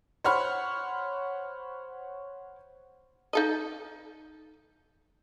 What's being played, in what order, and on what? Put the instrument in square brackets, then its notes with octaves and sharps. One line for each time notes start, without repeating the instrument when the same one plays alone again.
[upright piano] C5 C#5 F#5 B5 F6
[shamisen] D#4 A4 D#5